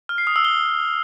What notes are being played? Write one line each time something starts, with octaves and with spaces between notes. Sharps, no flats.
F6
C7
D#6
E6
G7